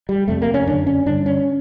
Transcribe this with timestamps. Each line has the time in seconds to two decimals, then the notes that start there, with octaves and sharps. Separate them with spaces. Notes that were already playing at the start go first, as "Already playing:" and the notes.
0.09 G3
0.28 F2 C3 A3
0.42 A#3
0.54 C#4
0.67 F#2 D3 D4
0.87 C#4
1.06 G2 D3 D4
1.26 C#4